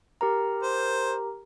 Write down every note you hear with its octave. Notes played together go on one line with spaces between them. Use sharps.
G4 A#4 A#5
C5